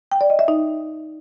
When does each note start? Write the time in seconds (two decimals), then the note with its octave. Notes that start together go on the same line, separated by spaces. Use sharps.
0.12 G5
0.21 D5
0.30 D#5
0.39 E5
0.48 D#4